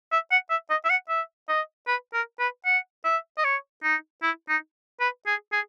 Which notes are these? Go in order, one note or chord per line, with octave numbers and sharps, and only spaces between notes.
E5
F#5
E5
D#5
E5
F#5
E5
D#5
B4
A#4
B4
F#5
E5
D#5
C#5
D#4
E4
D#4
B4
G#4
G#4